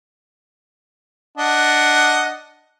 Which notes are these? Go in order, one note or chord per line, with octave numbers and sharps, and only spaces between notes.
D4 D#5 F#5